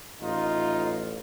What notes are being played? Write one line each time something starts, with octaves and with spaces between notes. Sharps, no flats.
A1 D#4 F4